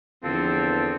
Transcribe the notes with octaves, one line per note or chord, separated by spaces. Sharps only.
E2 D3 F3 C4 F4 A4